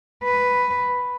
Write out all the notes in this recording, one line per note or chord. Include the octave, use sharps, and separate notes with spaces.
B4